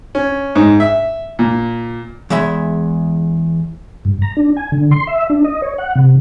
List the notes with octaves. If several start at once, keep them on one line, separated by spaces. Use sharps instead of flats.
C#4
G#2
E5
A#2
E2 G#3 E5 B5
G2
A#5
D4
G#5
D3
C6
E5
D4
D#5
C#5
F#5
C3